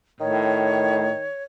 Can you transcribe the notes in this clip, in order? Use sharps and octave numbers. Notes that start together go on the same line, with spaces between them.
A2 D#3 C#5